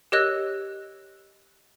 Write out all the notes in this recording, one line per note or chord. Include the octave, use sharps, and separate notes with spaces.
G4 A#4 C#5 D#5 E6 F#6